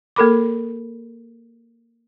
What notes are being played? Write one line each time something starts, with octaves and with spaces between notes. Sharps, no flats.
A#3 A4 A#4 B5 D6